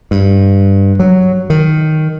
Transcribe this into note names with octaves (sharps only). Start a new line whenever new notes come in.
G2
F#3
D#3